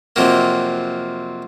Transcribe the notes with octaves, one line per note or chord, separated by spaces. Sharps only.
F2 C3 F#3 A#3